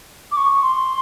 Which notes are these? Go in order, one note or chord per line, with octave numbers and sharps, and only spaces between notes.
D6
C#6
C6